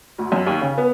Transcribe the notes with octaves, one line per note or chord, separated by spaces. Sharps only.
D2
F#2
D#2
C#3
B3